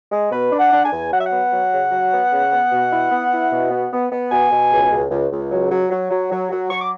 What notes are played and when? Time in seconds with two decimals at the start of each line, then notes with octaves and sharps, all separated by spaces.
0.12 G#3
0.32 B2 B4
0.53 D4
0.59 F#5
0.72 D4
0.85 G#5
0.92 E2
1.12 F#3 F#5
1.19 E5
1.26 F#5
1.32 B3
1.52 F#3
1.72 C#3
1.91 F#3
2.12 B3
2.32 C#3
2.52 B3
2.72 B2
2.92 E4
3.12 B3
3.32 E4
3.52 B2
3.71 B3
3.92 B3
4.11 B3
4.31 B2 G#5
4.51 B2
4.71 C#2
4.91 C#2
5.10 C#2
5.31 C#2
5.51 F#3
5.71 F#3
5.90 F#3
6.10 F#3
6.31 F#3
6.50 F#3
6.70 F#3 C#6
6.80 D6